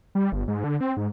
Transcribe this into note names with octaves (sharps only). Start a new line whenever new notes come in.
G3
G1
G#2
D3
C4
G#2